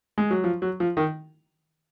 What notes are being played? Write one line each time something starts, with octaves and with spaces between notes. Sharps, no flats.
G#3
F#3
F3
F#3
F3
D#3